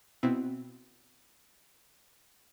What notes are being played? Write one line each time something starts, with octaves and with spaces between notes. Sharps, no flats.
B2 B3 C4 E4